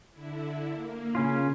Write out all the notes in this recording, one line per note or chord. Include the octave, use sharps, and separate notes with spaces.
D3 E4
A#3
C#3 C#4 F4